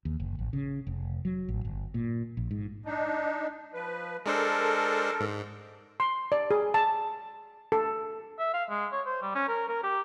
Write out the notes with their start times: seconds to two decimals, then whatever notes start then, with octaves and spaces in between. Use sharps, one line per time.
0.05 D#2
0.20 F#1
0.39 A1
0.53 C#3
0.87 F1
1.25 F#3
1.49 A1
1.65 G1
1.94 A#2
2.37 A#1
2.51 G#2
2.86 D4 D#4
3.73 F3 B4
4.26 G#3 D4 A4 A#4 C5
5.20 G#2
6.00 C6
6.32 D5
6.51 G#4
6.74 A5
7.72 A4
8.39 E5
8.54 F5
8.69 G#3
8.93 C#5
9.06 C5
9.23 G3
9.35 C#4
9.48 A#4
9.69 A#4
9.84 G4